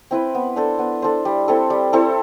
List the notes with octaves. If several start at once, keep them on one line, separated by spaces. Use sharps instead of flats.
C4 E4 B4
B3
D4 A4 C5
B3
D4 A4 C5
G3
C4 E4 A4
G3
C4 E4 A4